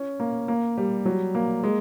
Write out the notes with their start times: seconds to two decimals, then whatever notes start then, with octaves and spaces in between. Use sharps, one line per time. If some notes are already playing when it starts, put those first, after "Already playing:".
Already playing: C#4
0.20 A#3
0.48 A#3
0.77 G3
1.06 F#3
1.35 A#3
1.64 G#3